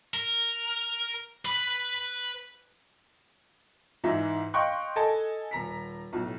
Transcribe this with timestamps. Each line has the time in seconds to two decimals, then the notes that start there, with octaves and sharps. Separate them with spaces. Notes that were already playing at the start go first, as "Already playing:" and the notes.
0.14 A#4
1.45 B4 B5
4.04 G#2 E3 D#4 E5
4.54 D#5 F5 G5 C6 C#6 F#6
4.96 A4 D#5 G#5 A5
5.51 D#1 A#5 B6
6.13 B1 A2